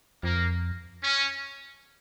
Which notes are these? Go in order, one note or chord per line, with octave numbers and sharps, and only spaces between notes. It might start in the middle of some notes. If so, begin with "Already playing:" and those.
F2 A#3
C#4